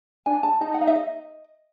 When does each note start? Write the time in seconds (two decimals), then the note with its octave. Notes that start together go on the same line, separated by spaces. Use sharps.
0.26 D4 G#5
0.43 A5
0.61 D#4 A5
0.74 F#5
0.81 F5
0.87 E5
0.95 D#5